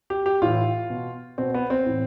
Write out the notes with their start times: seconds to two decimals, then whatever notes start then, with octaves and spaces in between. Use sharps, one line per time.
0.10 G4
0.26 G4
0.42 A2 E3 F4
0.90 B2
1.38 B2 C4
1.54 B3
1.70 C4
1.86 A2 E3